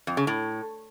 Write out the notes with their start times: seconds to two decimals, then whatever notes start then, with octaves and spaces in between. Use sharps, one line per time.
0.07 F2
0.17 C#3
0.27 A2